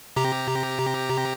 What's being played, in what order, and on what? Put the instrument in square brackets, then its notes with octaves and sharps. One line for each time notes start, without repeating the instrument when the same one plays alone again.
[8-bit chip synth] C3 G4 A#5